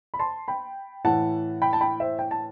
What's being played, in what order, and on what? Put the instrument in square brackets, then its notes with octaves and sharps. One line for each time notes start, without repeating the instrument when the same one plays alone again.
[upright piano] B5
A5 C6
G5 B5
A2 E3 F#5 A5
G5 B5
A5
G5 B5
C5 E5
G5
A5